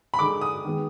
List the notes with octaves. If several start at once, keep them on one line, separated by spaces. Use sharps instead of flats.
B5
D3 G#3 D#4 D6
D#6
D#3 G#3 B3